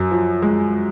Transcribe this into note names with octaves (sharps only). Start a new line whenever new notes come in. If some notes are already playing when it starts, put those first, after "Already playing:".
Already playing: F#2
F3
G#3